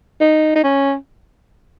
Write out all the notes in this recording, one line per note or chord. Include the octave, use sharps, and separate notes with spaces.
D#4
D#4
C#4